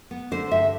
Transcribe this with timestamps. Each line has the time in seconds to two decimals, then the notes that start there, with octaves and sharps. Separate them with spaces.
0.11 B3
0.31 D3 C5
0.51 G2 E5